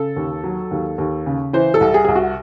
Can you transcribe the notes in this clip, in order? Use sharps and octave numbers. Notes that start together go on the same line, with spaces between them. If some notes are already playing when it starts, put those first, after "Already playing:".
Already playing: C#3 A4
D#2
F#3
D#2
D#2
C#3
E3 C5
A4
C2
G#4
C2 G#4
F#4